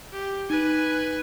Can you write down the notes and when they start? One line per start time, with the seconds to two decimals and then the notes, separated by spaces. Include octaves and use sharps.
0.13 G4
0.50 D#4 B4 G#5